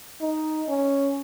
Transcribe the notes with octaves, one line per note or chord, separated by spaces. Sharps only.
D#4
C#4